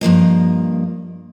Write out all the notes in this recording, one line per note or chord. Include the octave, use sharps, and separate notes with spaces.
G2 F3 A#3 D#5